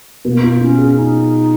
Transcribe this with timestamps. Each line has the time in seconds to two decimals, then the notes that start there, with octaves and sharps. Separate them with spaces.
0.25 B2 A#3
0.43 F4
0.61 C#4 F4
0.78 G#4
0.95 D#4